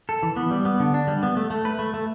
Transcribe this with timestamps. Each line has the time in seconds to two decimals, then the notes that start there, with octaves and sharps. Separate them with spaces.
0.09 A4
0.23 E3
0.36 B3
0.51 G3
0.65 B3
0.80 D3
0.94 D4
1.08 G3
1.23 B3
1.37 A3
1.50 A3
1.65 B4
1.79 A3
1.94 A3